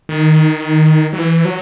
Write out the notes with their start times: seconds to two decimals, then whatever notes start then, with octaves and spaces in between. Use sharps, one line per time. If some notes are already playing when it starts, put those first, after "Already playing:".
0.09 D#3
1.13 F#3
1.19 E3
1.45 F#3